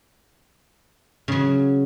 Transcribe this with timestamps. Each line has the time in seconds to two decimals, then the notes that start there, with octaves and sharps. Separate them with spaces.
1.28 C#3 F#3